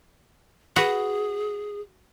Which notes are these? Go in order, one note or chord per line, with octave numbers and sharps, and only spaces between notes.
F#4 G#4 B4